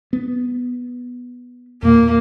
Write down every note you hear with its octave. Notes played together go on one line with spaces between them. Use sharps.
B3
E2 A#2 A#3